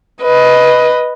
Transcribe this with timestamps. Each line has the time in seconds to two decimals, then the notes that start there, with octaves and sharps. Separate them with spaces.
0.22 B4 D#5